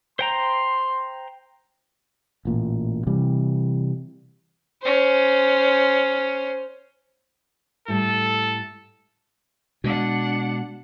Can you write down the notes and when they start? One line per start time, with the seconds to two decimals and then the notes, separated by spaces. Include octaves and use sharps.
0.19 C5 G5 A#5 C6
2.45 A1 A#2
3.07 C3 E3 G3
4.82 C#4 C5
7.88 A2 G3 A4
9.84 B2 G#3 D4 F#5